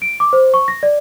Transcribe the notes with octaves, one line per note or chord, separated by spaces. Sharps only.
D7
D6
C5
C#6
A#6
D5